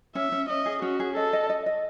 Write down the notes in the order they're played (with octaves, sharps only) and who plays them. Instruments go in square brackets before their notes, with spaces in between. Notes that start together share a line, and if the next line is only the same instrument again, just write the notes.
[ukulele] C#4 [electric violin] E5
[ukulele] C#4
[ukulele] C#4 [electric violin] D#5
[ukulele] G#4
[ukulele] C#4 [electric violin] F#4
[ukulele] G#4
[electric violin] A4 [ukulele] D#5
[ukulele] D#5
D#5
D#5